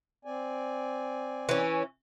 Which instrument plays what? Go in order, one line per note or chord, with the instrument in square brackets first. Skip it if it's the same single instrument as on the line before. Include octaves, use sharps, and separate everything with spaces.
[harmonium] C4 D5 G#5
[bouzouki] E3 C#4